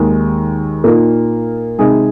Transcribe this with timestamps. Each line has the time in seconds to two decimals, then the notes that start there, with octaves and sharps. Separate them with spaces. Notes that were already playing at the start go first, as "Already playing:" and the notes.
Already playing: D#2 D#3 G#3
0.84 A#2 A#3 D#4 A#4
1.78 C3 G#3 D#4 G#4